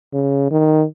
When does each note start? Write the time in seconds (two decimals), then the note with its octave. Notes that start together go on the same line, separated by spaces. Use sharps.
0.13 C#3
0.51 D#3